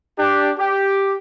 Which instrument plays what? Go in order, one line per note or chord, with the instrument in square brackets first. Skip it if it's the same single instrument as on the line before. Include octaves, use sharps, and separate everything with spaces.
[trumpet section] D4 G4
G4